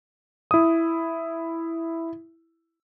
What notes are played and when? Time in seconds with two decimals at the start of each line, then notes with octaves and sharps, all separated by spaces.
0.51 E4 D#6